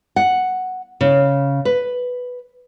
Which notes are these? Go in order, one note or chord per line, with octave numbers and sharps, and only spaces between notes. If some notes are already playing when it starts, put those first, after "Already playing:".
F#5
C#3
B4